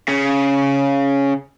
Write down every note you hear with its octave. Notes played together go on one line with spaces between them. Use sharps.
C#3